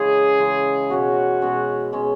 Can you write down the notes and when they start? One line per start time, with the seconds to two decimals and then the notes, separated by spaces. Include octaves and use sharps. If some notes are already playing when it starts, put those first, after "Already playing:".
Already playing: C#3 E3 G#3 G#4
0.39 C#3 E3 G#3
0.90 B2 G#3 C#4 F#4
1.42 B2 G#3 C#4
1.92 B2 G#3 C#4